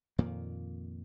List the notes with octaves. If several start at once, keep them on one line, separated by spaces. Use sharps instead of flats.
F2 A#2 D#3 A#3